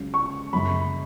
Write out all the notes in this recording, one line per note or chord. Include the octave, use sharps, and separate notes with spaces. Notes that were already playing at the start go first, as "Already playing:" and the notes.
Already playing: C#2 C#3 F#3
C#6
F#1 F#2 C#3 F#3 B5